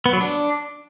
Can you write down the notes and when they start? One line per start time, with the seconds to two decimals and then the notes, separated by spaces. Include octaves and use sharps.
0.06 B3
0.13 F#3
0.20 D4